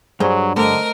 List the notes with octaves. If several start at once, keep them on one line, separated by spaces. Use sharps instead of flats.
G2 F#3 G#4 C5
D3 A3 C4 A#4 D#5